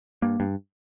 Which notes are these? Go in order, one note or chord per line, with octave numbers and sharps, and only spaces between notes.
G2 A#3
G2